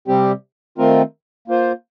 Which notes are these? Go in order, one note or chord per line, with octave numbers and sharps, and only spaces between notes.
C3 G3 C4 G4
D#3 A3 C4 F4 A#4
A#3 F4 C5